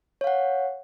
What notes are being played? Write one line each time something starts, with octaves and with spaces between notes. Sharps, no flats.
C#5 F5 F#5